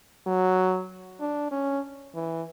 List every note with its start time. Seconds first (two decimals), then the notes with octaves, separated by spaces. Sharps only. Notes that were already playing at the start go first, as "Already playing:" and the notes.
0.26 F#3
1.20 D4
1.51 C#4
2.15 E3